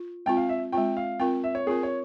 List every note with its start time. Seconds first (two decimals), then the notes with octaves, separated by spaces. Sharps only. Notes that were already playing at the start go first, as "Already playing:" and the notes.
Already playing: F4
0.26 G#3 C4 F4 G5
0.37 F5
0.49 E5
0.72 G#3 C4 F4 G5
0.97 F5
1.20 C4 F4 A#4 G5
1.44 E5
1.55 C#5
1.67 C4 F4 G#4 A#4
1.83 C#5